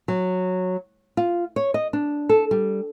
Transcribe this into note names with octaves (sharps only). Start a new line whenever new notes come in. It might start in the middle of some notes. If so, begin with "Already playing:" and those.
F#3
F4
C#5
D#5
D4
A4
G3